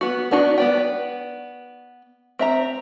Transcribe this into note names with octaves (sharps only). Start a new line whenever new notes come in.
B3 F#4
B3 D4 D#4 F#4
B3 D5 G5
C4 E5 A#5